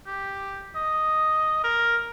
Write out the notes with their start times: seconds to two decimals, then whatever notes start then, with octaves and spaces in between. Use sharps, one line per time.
0.07 G4
0.76 D#5
1.64 A#4